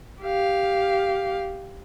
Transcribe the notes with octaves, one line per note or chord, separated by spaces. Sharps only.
G4 F5